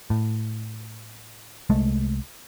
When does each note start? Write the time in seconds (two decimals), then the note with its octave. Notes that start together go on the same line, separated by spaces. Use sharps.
0.10 A2
1.70 C2 G#3 A3